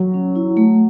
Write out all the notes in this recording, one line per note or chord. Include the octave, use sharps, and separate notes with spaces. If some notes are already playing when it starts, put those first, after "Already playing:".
Already playing: F#3
C#4
E4
A3